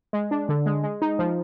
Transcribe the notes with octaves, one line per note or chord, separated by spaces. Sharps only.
G#3
D4
D3
G#3
G#3
D#4
F3